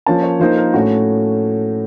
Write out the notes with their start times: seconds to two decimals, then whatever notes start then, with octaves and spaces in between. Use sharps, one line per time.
0.06 F3 A#3 C#4 A5
0.23 C#5
0.40 F3 A#3 D#4 C5
0.57 A#4
0.74 A2 A3 C#4 F#4